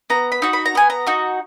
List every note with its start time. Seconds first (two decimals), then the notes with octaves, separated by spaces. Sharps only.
0.10 B3 A#5
0.32 B5
0.42 D#4 F#4
0.53 B5
0.66 A#5
0.75 B3 G#5
0.90 A#5
1.07 D#4 F#4